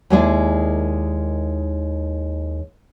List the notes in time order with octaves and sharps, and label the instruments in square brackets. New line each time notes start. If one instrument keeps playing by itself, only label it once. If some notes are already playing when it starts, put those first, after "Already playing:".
[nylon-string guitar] D#2 D#3 G#3 E4 G#4 D5